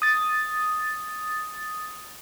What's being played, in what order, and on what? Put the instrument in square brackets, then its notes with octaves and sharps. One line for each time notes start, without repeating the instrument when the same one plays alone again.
[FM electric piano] D#6 A6